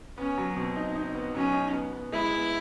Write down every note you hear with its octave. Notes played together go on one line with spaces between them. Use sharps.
B3 C#4
F#3
B2 C4
D#4
D#4
B3
F#3 C#4
D#4
B3
B3
G#3 E4
B3